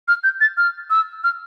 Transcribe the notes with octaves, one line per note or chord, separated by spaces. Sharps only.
F6
G6
A6
F6
E6
F6